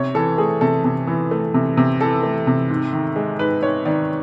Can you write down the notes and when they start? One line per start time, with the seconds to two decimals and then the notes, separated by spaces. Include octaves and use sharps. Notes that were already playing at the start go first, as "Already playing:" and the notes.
Already playing: C3 C#5
0.15 E3 A4
0.38 A3 G#4
0.61 C3 A4
0.84 C3
1.07 E3
1.31 A3
1.54 C3
1.77 C3
2.01 E3 A4
2.23 A3
2.47 C3
2.69 G#2
2.93 D#3
3.16 G#3
3.39 G#2 B4
3.62 G#2 C#5
3.85 D#3 D5